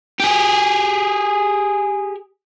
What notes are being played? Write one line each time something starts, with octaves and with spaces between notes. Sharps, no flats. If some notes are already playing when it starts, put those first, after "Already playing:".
G4 G#4